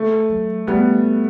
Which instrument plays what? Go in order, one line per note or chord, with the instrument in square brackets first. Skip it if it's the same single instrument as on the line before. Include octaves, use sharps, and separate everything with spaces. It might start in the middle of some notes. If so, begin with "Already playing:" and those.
Already playing: [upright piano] A3
[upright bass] F#3
[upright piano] G3 B3 [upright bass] A3